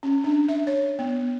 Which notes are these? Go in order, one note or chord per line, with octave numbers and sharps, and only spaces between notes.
C#4
D4
E5
C#5
B3